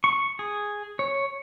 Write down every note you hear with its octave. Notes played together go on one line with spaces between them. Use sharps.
C#6
G#4
C#5